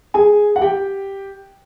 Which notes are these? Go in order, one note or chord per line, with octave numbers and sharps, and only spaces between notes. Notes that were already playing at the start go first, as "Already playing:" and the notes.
G#4 G#5
F#5
G4 G5